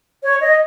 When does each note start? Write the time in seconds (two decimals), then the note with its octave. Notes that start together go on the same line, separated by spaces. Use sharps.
0.23 C#5
0.41 D#5